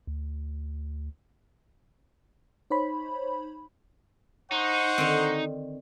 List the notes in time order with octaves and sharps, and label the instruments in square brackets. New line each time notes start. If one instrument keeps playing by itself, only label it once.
[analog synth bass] D2
[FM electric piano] D#4 C5 C#5 B5
[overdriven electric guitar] D#4 [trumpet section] C5 F#5 C#6
[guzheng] D3 D#3 C4